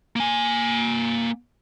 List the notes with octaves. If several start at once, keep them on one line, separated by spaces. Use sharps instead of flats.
A#3 G#5